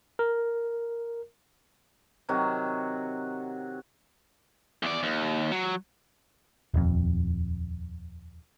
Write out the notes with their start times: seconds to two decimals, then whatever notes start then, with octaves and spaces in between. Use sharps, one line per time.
0.19 A#4
2.29 C3 D#3 F#3 F#4
4.83 E2 D5
5.03 D#2
5.52 F#3
6.74 D#1 F2